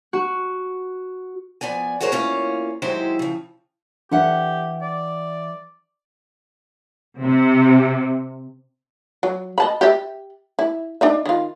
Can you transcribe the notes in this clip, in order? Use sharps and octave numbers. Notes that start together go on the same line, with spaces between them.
F#4
F3 B3 D5 G#5
F#4 G#4 A#4 C5 C#5
E2 A#3 C#4 F4 C#5
D#2 F#3 G#3 E4 G4 C5
C#3 F3
E3 D4 G4 F#5 G5
D5
C3
F#3
D#5 A5 B5
G4 E5
E4
D4 D#4 E5
D#3 F4